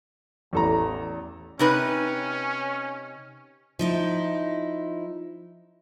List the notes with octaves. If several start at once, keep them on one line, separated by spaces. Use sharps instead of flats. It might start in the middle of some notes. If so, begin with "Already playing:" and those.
A1 E2 A4 A#5
C3 C#4 D#4 B4
F3 D#4 E4